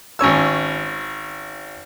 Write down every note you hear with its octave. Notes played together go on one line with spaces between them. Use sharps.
G#1 C#4 C#5 E6